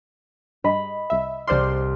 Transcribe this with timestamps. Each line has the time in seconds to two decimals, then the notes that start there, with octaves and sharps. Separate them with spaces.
0.64 G2 D#5 B5
1.10 C2 E5
1.47 C2 C5 D5 C6 F6